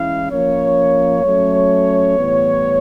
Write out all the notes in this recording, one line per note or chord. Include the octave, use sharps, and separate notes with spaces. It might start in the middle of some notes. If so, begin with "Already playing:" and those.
Already playing: E3 G#3 C#4 E4 F5
F3 A#3 C#4 C#5
F#3 A3 C#4
A2 E3 G3 B3